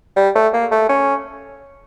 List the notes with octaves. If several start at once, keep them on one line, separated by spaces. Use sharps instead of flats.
G3
A3
A#3
A3
C#4